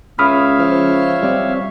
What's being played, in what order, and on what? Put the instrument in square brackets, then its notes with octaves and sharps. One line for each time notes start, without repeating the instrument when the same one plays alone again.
[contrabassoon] C#2 [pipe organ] C#5 E5 F5 [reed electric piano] B5 D#6 F6
[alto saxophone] F3
[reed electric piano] G3 C4 D5